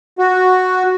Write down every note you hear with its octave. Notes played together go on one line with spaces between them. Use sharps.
F#4